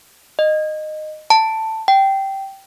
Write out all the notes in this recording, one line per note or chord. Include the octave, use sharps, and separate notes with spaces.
D#5
A5
G5